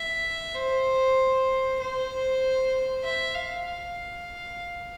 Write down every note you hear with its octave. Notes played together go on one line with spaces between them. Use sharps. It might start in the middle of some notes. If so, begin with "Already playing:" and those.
Already playing: E5
C5
C5
E5
F5
F5